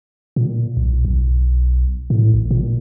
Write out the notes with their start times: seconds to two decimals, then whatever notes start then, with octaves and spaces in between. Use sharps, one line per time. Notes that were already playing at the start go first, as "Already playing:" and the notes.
0.36 A#2
0.77 B1
1.05 B1
2.10 A2
2.34 A1
2.51 A#2